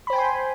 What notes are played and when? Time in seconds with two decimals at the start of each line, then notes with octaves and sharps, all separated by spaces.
0.07 B5
0.10 C5
0.13 G5
0.16 G#5
0.18 C6